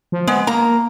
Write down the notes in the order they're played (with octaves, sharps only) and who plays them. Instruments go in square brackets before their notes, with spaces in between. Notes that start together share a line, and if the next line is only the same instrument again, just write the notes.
[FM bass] F3
[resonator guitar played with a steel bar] G#3 [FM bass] B3
[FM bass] A#3 [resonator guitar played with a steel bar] A#5